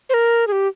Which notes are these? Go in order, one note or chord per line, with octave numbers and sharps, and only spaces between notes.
C5
A#4
G#4
G4